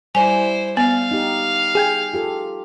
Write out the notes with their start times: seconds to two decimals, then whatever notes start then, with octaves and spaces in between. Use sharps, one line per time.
0.15 G3 E4 C5 D5 G#5
0.77 B3 F5
1.11 D#4 G4
1.75 G#4 G5 G#5
2.13 F4 G4 A4